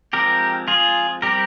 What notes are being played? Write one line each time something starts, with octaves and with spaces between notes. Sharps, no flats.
F3 G#3 C4 G4 A#4
F4 G#4
G3 C4 G4 A#4